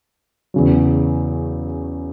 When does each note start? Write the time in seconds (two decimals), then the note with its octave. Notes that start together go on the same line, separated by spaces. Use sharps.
0.54 E2 C#3 F#3